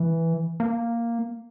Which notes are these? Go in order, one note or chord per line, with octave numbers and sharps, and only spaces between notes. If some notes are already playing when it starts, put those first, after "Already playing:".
Already playing: E3
A#3